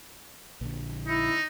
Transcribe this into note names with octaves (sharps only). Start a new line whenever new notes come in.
A#1 D3
D#4 E4